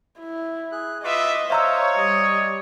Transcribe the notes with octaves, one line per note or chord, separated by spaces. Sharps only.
E4
G#4 F#6
F4 B4 D#5 E5 D6
C5 C#5 E5 F5 A#5 E6
G3 D#5